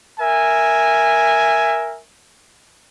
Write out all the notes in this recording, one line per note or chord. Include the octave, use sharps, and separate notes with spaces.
A#4 E5 G#5